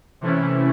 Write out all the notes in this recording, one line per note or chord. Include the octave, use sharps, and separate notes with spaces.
C3 E3 A3 C#4 E4